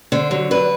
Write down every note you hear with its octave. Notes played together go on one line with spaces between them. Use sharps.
D3 C5
F#3
D3 B4